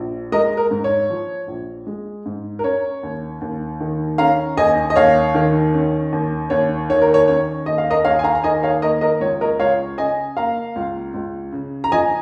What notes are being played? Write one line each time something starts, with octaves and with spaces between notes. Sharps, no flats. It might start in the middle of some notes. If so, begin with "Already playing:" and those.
Already playing: A#1
G#3 A#4 D#5
A#4
G#2
C#5
F3
A#1
G#3
G#2
A#4
C#4 C#5
D#2
D#2
D#3
C#4 F5 A#5
D#2 D#5 G#5
D#5
D#2 C#5 F5
D#3
C#4
D#2
D#2 C#5
D#3 C#5
A#4
C#5
C#4 C#5
D#2 D#5
F5
A#4 D#5
D#2 C#5 F5
G#5
F5 A#5
A#5
D#3 D#5 G#5
C#5 F5
A#3 A#4 D#5
A#4 D#5
C#2 C#5
A#4 D#5
C#2 C#5 F5
C#3 D#5 G#5
A#3 F5 A#5
C#2
C#2
C#3
A#5
F3 D#5 G#5